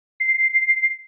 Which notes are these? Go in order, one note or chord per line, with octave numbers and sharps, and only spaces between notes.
C7